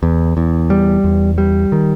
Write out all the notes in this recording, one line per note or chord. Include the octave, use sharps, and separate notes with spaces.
E2
E2
G3
E2
G3
D#3